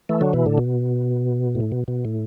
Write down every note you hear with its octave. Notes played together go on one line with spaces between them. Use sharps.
E3 A3
D3 F#3
B2 E3
A2 D3
B2
A2
B2
B2
A2